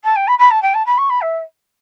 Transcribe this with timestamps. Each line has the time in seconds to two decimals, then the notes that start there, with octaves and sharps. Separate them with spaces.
0.04 A5
0.15 G5
0.27 B5
0.38 B5
0.50 A5
0.62 G5
0.74 A5
0.86 B5
0.98 C#6
1.09 B5
1.21 E5